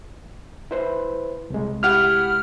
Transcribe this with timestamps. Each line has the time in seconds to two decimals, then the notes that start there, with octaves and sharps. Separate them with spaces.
0.71 E4 B4 C5
1.50 C2 G#3
1.83 E4 G4 F#5 F6